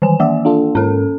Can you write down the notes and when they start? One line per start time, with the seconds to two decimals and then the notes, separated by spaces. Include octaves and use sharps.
0.02 D#3 E3 G#5
0.20 A#3 D5 E5
0.45 D4 F4 A4
0.75 G#2 C#4 A4 A#4